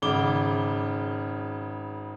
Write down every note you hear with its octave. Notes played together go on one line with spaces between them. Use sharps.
G#1 C#3 D6 G7